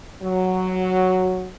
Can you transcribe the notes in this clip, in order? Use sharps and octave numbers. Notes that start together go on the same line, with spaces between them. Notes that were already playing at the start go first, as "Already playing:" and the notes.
F#3